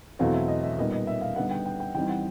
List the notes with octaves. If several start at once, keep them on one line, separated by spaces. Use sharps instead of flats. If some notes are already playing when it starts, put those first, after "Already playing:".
E2 B2 F#3 A3 C4 F5
E5
D#5
E5
A#2 G3 B3 D#4 D#5
D#5
E5
F5
D3 G3 B3 D#4 F#5
G5
G5
G5
E3 G3 C4 D#4 G5
F#5